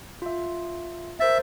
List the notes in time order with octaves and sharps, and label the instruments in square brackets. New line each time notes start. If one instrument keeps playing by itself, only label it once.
[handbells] F4 E5
[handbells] A#4 C5 A6 [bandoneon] E5